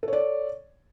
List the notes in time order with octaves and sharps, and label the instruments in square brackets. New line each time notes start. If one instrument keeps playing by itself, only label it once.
[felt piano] A4
C#5
D5